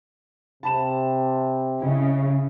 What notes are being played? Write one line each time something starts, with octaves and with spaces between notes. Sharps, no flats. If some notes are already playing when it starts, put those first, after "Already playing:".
C3 A5 B5 E7
C#3 E4 D#5